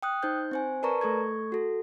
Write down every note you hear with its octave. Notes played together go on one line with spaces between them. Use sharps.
G5 D#6 F#6
D#4 C5 G6
C4 C5 G#5
A#4 B4 D5 A5 A#5 C#6
A3 A4 C#6 G#6
F#4 A4